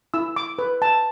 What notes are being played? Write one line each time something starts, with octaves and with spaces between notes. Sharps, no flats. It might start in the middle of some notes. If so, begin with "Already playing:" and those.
E4 E6
D6
B4
A5